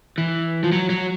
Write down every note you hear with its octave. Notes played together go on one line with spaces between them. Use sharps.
E3
F3
F#3
F#3